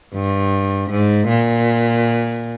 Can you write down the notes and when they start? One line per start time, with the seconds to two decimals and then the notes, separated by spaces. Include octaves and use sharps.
0.14 G2
0.91 G#2
1.28 A#2